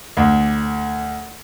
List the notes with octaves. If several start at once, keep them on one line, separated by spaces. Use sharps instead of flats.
D2